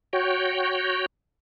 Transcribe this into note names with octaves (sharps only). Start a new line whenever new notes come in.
F#4 C#5 G5